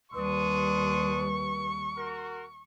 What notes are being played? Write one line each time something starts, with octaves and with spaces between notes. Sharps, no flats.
D#2 G3 D4 B4 C6 C#6 D#6
F#4 A#4